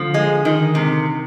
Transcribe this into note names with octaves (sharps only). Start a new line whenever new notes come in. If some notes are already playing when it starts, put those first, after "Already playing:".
Already playing: D3 F3
G#3
D#3
C3